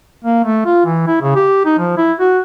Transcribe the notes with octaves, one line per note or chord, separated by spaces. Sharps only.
A#3
A3
F4
E3
E4
C#3
G4
D#4
F3
E4
F#4